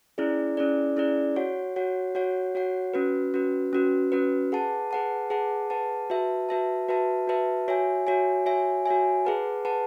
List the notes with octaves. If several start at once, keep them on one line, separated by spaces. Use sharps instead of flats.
C#4 E4 G#4 D5
C#4 E4 G#4 D5
C#4 E4 G#4 D5
F#4 C#5 F#5
F#4 C#5 F#5
F#4 C#5 F#5
F#4 C#5 F#5
C#4 F#4 B4
C#4 F#4 B4
C#4 F#4 B4
C#4 F#4 B4
G#4 B4 F#5 A5
G#4 B4 F#5 A5
G#4 B4 F#5 A5
G#4 B4 F#5 A5
F#4 B4 E5 A5
F#4 B4 E5 A5
F#4 B4 E5 A5
F#4 B4 E5 A5
F#4 C#5 E5 G#5
F#4 C#5 E5 G#5
F#4 C#5 E5 G#5
F#4 C#5 E5 G#5
G#4 B4 F#5 A5
G#4 B4 F#5 A5